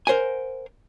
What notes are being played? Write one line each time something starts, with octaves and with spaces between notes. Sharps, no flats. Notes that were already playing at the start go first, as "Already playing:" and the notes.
A#4 C5 F#5 G#5